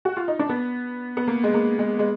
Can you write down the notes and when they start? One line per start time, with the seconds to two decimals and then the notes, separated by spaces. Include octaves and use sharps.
0.05 F#4
0.17 F4
0.28 D#4
0.39 D4
0.49 B3
1.17 B3
1.28 A#3
1.44 G#3
1.54 A#3
1.79 G#3
1.99 G#3